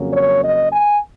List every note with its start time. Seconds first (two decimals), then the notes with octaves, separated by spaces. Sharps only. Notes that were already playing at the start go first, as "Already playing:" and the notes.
Already playing: F2 C#3 F#3 A#3 C#4
0.12 C#5
0.42 D#5
0.71 G#5